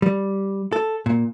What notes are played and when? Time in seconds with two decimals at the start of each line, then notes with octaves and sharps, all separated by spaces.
0.02 G3
0.72 A4
1.06 A#2